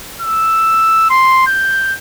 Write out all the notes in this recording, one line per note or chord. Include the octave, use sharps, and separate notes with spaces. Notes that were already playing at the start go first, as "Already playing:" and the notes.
E6
C6
G6